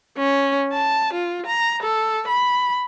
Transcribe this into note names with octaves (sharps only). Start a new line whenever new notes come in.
C#4
A5
F4
A#5
A4
B5